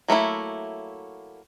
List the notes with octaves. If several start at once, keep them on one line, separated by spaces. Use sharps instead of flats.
F#3 A3 A#3 E4